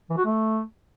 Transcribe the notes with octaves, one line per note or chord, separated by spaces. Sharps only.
E3
F#4
A3